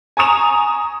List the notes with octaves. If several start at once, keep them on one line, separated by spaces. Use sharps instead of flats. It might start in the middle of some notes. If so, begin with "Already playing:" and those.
G#5 A#5 C#6 D#6 E7 F7